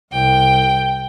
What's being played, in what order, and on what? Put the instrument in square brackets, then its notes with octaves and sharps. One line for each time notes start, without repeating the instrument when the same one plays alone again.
[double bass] C2 [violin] G5